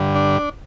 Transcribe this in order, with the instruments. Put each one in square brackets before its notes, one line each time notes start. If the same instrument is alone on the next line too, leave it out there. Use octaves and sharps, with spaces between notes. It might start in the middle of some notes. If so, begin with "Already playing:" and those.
Already playing: [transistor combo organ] G2 D3
D4